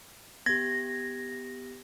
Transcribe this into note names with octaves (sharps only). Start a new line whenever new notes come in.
B3 G4 G#6 A#6